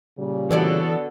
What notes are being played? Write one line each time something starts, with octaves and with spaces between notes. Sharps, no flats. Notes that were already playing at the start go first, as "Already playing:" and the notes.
A#2 C#3 G3
D3 E3 B3 F#4 A4 C#5 D5